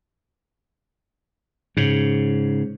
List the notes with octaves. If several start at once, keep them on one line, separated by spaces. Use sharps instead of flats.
G#2 C#3